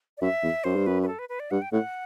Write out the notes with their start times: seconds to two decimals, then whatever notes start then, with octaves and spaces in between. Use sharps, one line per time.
0.18 D5
0.21 F#2 E5
0.43 E2
0.64 F#2 C5
0.75 G2
0.86 F#2 B4
1.03 B4
1.08 A4
1.19 B4
1.29 B4
1.40 D5
1.51 G2 F#5
1.62 G5
1.72 A2 F#5